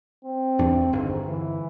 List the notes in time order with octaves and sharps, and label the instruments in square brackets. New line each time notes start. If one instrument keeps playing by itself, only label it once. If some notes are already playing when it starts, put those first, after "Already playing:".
[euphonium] C4
[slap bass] E2 D4
[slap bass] G1 [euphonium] G#2
[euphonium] E3